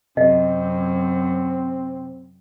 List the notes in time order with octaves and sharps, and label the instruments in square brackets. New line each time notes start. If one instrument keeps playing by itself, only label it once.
[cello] F#2 [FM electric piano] C3 [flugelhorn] C4 [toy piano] D#5